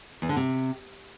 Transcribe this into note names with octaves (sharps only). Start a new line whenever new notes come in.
E2
D3
C3